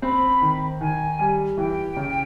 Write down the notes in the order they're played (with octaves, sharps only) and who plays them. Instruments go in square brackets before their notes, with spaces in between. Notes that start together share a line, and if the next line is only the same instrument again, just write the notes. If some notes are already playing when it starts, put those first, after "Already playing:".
[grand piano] C4 [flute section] B5
[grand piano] D#3
[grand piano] D#3 [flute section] G#5
[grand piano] G3
[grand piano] E3 [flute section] G5
[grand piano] C#3